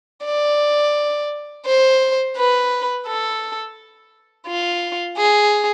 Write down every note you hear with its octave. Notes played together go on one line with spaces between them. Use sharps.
D5
C5
B4
A4
F4
G#4